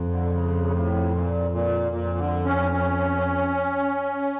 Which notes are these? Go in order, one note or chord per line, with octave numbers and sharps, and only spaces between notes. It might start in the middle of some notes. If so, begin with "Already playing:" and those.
Already playing: F2
D3
A#2
C#3
A2
A#2
A#2
F2 A#2
D3
C#4
C#4